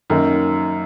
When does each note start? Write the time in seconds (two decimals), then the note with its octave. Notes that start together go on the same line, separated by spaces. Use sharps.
0.10 F#2 D#3 A#3 D#4